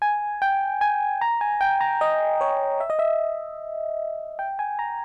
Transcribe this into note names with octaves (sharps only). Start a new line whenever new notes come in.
G#5
G5
G#5
A#5
G#5
G5
A#5
D#5
C#5
E5
D#5
E5
G5
G#5
A#5